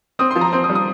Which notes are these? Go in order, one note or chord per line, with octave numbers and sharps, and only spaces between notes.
C4 D#6
F3 C6
A#5
C4 C6
D#6
G3
D#6